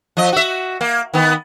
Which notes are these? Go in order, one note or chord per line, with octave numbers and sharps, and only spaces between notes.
F3 D#5
F#4 E5
A#3
D#3 B3